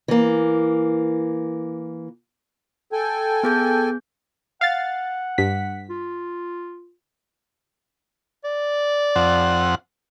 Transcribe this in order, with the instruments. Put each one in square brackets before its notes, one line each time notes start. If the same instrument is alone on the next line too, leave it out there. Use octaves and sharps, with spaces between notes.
[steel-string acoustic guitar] E3 A#3
[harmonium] A4 G5 G#5
[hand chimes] B3 G#4 G6
[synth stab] F5 A6 [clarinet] F#5
[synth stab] G2 B6
[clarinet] F4
D5
[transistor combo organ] F2 C4 F#5